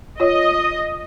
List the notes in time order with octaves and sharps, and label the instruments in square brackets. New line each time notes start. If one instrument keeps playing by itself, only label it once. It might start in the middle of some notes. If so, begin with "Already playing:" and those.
[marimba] F4 C#5 [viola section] D#5